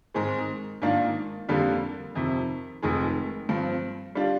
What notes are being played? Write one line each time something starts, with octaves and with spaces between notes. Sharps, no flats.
G#2 D#3 G#3 C4
G#2 D#3 A#3 D4 F4
F2 D3 G3 A#3 F4
F2 C3 D#3
F1 F2 D#3 G#3
G2 F3 C4
G3 D4 F4